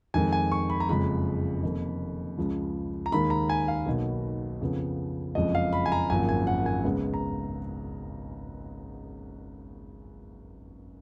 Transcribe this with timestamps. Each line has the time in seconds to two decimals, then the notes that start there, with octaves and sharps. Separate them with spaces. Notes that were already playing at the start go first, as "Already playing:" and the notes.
0.14 F2 D#3 G#3 G#5
0.32 G#5
0.52 C#6
0.70 B5
0.80 A#5
0.88 F#1 F2 C#3 F3 G#3 B5
1.63 F1 F2 D#3 A#3 D#4
2.38 C#2 C#3 F3 G#3
3.06 A#5
3.12 D#2 D#3 G#3 B5
3.30 A#5
3.49 G#5
3.68 F5
3.86 B1 B2 A#3 D#4
4.61 F2 C#3 F3 B3
5.35 F#1 F2 F3 G#3 D#5
5.55 F5
5.73 B5
5.86 G#5
5.92 A#5
6.10 G#1 F#2 F3 A#3 G#5
6.29 G#5
6.47 F#5
6.66 G#5
6.84 C#2 C#3 G#3 B3
7.14 A#5